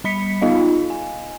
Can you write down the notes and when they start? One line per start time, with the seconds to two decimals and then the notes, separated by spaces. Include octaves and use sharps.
0.04 G3 B5 B6 C#7
0.42 B3 D#4 F4 D#5 F5
0.90 G#5